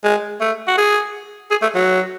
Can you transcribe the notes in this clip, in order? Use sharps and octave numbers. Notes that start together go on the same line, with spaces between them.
G#3
A3
F#4
G#4
G#4
A3
F#3